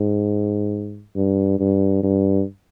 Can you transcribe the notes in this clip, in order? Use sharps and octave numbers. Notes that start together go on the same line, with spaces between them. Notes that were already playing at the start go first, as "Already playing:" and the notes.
Already playing: G#2
G2
G2
G2